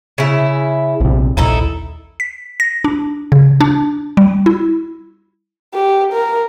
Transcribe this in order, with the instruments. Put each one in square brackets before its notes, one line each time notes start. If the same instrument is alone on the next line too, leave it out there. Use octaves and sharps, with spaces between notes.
[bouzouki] C#3 E4
[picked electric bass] A#1 C3
[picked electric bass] A#1 D#2 [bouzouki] D#4 E4 A4
[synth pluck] B6
A#6
D4
C#3
D4
G3
E4
[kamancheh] G4
A#4